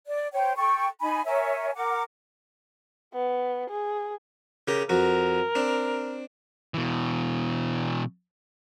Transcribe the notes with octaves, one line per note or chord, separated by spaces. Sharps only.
D5
C5 C#5 G5
A4 G5 C#6
D#4 G#5 B5
A#4 C#5 E5 G#5
A#4 F#5 D6
B3
G#4
C#3 G4 A#4
F2 F#4 A#4
C4 D4
B2 E3